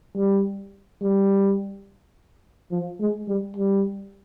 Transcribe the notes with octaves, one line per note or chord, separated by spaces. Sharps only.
G3
G3
F3
G#3
G3
G3